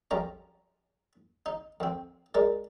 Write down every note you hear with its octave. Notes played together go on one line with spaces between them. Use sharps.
F2 G3 C#4 A#5
D#4
F2 C4
G#3 A#4 D5